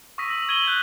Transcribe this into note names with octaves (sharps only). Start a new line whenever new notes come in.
C#6 D#6 E6 A#6 B6 D#7
E6 F#7
E6 G#6 D#7 F#7 G7
F#6 G6